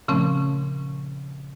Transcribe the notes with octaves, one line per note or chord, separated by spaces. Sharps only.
A#2 C#3 F3 A3 C4 C#4